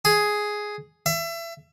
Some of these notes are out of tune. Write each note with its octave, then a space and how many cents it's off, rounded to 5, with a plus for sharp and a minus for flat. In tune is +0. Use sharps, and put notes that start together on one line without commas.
G#4 +5
E5 +30